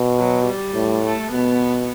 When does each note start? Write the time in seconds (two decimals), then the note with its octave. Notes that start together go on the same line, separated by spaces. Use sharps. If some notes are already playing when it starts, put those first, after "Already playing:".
Already playing: B2
0.18 F#3
0.46 G3
0.74 A2
1.03 A3
1.31 B2 B3